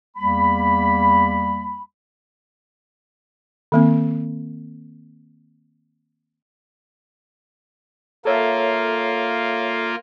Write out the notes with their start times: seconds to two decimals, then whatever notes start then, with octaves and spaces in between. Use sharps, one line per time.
0.17 E2 G3 A#3 B5
3.72 D#3 A#3 C4
8.25 A#3 F4 A4 C#5 E5